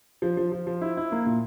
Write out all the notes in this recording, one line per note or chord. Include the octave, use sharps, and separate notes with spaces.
F3
F3
F3
F3
E4
E4
A#3
A#2